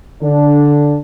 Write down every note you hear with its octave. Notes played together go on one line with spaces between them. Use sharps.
D3 D4